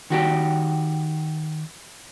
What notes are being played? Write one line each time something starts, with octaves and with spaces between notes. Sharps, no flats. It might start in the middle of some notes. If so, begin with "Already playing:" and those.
D#3 F#4 G4